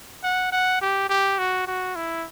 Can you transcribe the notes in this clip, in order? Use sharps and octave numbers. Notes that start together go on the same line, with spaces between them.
F#5
F#5
G4
G4
F#4
F#4
E4